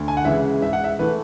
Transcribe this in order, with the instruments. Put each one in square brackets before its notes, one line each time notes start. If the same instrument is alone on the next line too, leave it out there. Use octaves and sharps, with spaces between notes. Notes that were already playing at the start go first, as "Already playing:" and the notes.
Already playing: [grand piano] D2
G#5
F#5
C#3 E3 G#3 E5
G#2 E5
F#5
E5
E3 A3 B4